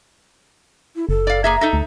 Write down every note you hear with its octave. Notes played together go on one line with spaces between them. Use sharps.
E4
F#1 A4
D5 F5
A#3 G#4 E5 A#5
D#4 A4 E5
D2